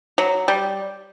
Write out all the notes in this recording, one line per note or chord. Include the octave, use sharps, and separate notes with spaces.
F#3
G3